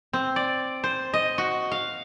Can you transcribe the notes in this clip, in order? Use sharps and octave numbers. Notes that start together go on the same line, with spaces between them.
C4
D5
C5
D#5
F#4
F5